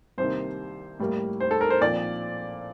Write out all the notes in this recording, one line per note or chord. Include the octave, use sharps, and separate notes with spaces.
C2 C3 D#3 A#3 C5
A2 G3 A#3
C5
A4
A#4
C5
A#2 F3 C4 D5